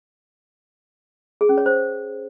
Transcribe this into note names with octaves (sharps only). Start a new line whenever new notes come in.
G#4
C#4
C#5
C5